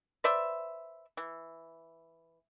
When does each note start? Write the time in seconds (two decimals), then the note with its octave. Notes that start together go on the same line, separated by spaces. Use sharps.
0.24 B4 C5 D5 E5
1.17 E3